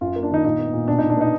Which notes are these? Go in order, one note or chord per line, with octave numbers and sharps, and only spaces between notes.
F#2 F4
A#3
D4
D#3 D#4
A#2 D#4
B3
A#2
B2 D4
B2 D#4
D4
B3 D#4